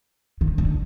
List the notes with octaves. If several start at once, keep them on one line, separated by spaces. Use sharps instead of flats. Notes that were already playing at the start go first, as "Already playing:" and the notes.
D#3
D3